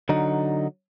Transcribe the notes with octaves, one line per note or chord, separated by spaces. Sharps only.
D3 F#3 D#4